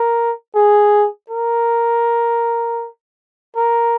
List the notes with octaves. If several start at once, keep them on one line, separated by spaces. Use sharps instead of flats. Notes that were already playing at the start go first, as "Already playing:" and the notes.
Already playing: A#4
G#4
A#4
A#4